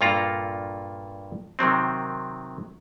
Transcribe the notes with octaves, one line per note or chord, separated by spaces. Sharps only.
G2 A#2 A#3 F4 A4 A#5
C3 D#3 F#3 C4